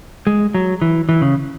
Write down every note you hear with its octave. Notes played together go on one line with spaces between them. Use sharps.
G#3
F#3
E3
E3
C#3